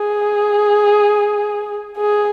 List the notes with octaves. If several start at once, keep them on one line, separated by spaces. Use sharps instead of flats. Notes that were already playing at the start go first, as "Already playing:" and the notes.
Already playing: G#4
G#4